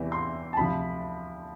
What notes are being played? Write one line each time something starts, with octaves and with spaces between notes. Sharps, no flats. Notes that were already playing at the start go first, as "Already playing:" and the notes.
Already playing: E2 C3 E3
C6
A5
D2 C3 F3 B5